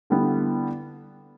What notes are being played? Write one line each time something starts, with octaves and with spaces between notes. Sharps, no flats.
D3 G3 B3 E4